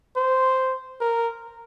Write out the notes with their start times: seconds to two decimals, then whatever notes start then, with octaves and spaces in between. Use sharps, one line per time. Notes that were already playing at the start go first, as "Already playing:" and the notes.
0.16 C5
1.01 A#4